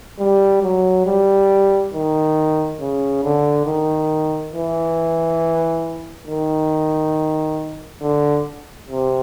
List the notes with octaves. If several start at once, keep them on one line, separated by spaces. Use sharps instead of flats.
G3
F#3
G3
D#3
C#3
D3
D#3
E3
D#3
D3
C3